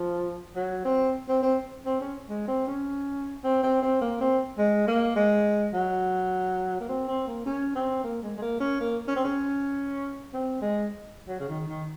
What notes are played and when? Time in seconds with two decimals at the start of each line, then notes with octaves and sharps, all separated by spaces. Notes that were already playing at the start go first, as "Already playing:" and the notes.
Already playing: F3
0.56 F#3
0.85 C4
1.29 C4
1.43 C4
1.86 C4
2.01 C#4
2.29 G#3
2.48 C4
2.67 C#4
3.44 C4
3.63 C4
3.82 C4
4.01 A#3
4.21 C4
4.58 G#3
4.88 A#3
5.16 G#3
5.74 F#3
6.81 A#3
6.89 C4
7.08 C4
7.27 A#3
7.46 C#4
7.75 C4
8.04 A#3
8.23 G#3
8.37 G#3
8.42 A#3
8.60 C#4
8.80 A#3
9.08 C#4
9.16 C4
9.24 C#4
10.34 C4
10.62 G#3
11.29 F#3
11.40 C#3
11.49 D#3
11.67 D#3